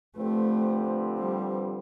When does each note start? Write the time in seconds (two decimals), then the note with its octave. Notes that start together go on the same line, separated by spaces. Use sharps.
0.16 D3 F3 A3 C4 G4 B4
1.19 G3